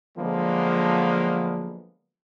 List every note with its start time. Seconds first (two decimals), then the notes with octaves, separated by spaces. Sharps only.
0.17 D3 F3 F#3 G#3 A#3 B3